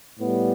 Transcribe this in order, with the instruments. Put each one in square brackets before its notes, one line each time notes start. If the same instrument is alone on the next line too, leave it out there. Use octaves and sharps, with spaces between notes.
[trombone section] A2 G3 B3